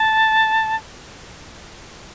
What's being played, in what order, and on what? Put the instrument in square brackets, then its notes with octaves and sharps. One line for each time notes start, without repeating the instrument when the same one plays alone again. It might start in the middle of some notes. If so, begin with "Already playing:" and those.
Already playing: [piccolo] A5